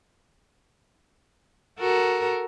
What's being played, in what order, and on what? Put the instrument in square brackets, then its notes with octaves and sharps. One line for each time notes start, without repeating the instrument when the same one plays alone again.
[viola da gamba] F#4 A4 A#4